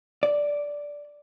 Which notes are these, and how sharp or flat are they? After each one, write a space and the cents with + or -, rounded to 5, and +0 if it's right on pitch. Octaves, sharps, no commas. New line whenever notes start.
D5 -5